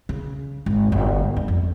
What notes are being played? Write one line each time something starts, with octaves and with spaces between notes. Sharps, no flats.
C#3
G#1
G1
D4
F2